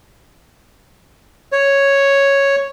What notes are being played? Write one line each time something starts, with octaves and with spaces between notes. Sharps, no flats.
C#5